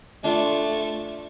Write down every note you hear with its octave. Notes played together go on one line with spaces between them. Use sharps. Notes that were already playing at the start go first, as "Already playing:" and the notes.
A3 D4 F4